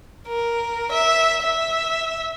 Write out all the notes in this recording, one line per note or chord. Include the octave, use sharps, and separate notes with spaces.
A#4
E5
E5